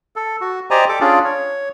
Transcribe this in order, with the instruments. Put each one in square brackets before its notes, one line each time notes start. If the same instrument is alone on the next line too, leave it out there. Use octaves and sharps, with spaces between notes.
[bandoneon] A4
F#4
G4 C5 D5 D#5 G#5 A#5
G4 A4 D6
C#4 D4 F4 G#4 D5
C#5